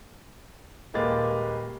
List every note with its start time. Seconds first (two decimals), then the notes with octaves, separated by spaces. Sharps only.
0.94 D#1 G#3 A#3 G4 B4 A6